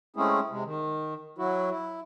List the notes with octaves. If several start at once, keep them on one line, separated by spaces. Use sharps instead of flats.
G#3 A3 C4 C#4 E4 G#4
C3 G#3
D#3
F#3 E4 F#4
E4